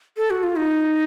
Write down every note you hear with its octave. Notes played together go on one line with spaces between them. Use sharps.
A4
F#4
F4
D#4